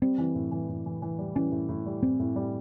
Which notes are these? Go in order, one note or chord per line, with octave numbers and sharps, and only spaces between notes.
G3 C4
E3
A2
E3
A2
E3
E3
G3
E3 C#4
A2
A2
G3
A2 C4
A2
G3